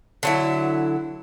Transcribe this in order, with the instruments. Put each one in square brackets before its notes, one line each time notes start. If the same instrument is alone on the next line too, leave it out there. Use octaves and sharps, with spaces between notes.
[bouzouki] D3 F#3 E4